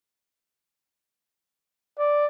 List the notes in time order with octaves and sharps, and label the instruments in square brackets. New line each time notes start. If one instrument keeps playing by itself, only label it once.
[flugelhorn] D5